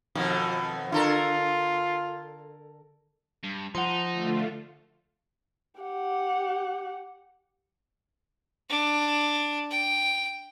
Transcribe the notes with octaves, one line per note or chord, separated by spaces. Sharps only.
F2 B2 D#3
D3 F4 A4 A#4
G2
F3 D#4 F#5 C6
D3 A3 F4
G4 F#5
D4
G5